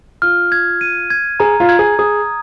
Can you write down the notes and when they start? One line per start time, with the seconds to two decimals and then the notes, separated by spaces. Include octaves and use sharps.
0.22 F4 F6
0.52 G#6
0.81 D#7
1.10 G#6
1.40 G#4 A#5
1.60 F4
1.69 G#6
1.79 G#4
1.99 G#4 D#6